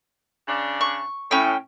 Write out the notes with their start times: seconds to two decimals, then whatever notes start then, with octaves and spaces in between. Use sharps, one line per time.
0.48 C#3 D4
0.81 C#6
1.31 A2 C#4 G5